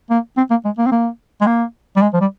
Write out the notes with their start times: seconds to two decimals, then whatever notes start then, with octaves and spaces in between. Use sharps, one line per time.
0.10 A#3
0.37 C4
0.51 A#3
0.65 G#3
0.78 A#3
0.86 C4
0.92 A#3
1.41 G#3
1.47 A#3
1.96 G3
2.02 G#3
2.13 F3
2.21 G3